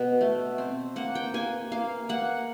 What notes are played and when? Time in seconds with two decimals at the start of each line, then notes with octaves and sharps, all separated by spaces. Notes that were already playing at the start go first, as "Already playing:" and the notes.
Already playing: B2
0.21 A3
0.58 C4
0.96 A#3 F#5
1.15 G5
1.34 A#3 G#5
1.72 A#3 F5
2.09 A#3 F#5